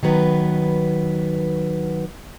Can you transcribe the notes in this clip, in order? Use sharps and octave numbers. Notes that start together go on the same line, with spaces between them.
D#3 F#3 B3 B4